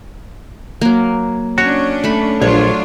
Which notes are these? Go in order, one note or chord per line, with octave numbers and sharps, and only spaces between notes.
F#3 A#3
C#4 D4 F#4 C#5
A3 B5
A#1 F#3 D4 F4 C#5